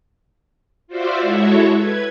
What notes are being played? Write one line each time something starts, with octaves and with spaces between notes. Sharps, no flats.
F4 F#4 C5 D5 E5 F5
G#3 E4 F#4 A4 C#5 E5
B4 G#6